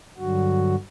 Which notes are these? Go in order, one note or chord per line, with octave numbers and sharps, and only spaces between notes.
G2 D3 F#3 F#4